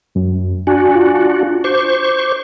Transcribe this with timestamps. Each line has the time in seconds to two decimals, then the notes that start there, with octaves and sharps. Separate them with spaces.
0.15 F#2
0.67 D4 F#4 G#5
0.95 F4
1.64 C5 C#6 D6